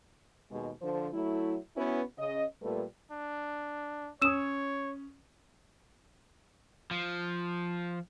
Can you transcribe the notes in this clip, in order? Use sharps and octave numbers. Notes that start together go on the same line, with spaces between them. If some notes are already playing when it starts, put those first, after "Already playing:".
D#2 B2 G#3
D3 F3 C5
F#3 A3 E4
B3 C#4 E4 F#4 B4
C#3 D#5
A#2 G3 A3 A4 B4
D4
C#4 C#5 D#6 E6 E7
F3